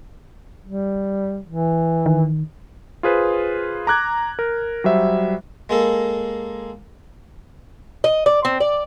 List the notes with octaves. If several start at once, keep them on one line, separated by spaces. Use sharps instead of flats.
G3
E3
D#3
F4 G#4 B4 C5
A#5 D6 F#6 G#6
A#4
F#3 G3 C5 E5
G#3 A#3 A4
D#5
D5
C4
D5